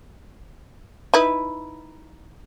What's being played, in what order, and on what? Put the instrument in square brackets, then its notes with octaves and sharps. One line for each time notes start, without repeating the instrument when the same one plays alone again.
[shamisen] D#4 E4 B4